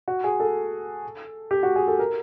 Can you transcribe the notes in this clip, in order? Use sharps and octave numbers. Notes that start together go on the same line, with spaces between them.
F#4
G#4
A4
G4
F#4
G#4
A4
A#4